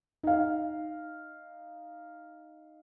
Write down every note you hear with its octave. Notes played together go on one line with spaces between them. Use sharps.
D#4 F5